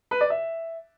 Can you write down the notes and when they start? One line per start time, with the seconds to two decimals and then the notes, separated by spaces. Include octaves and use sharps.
0.11 B4
0.21 D5
0.30 E5